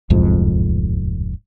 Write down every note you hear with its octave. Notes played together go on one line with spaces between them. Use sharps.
D1 C2 F2 G#2